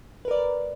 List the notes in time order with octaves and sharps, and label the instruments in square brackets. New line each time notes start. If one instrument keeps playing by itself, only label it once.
[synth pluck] B4
A#4
D5